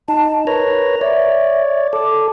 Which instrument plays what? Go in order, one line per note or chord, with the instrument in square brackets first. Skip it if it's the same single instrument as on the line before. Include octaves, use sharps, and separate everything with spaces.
[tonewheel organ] D#4 [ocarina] A5
[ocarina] A#4 [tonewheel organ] B4 C#5 A#5
[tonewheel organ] C#5 D5 [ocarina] E5
[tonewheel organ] A4 [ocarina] D6